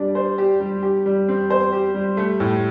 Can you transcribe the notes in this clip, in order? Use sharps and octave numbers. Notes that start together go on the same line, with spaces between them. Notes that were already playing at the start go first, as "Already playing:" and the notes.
Already playing: G3 D4
C5
G4
G3
G4
G3
C4
C5
G4
G3
A3
A2